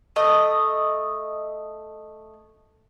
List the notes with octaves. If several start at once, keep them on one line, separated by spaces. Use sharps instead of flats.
A3 D#5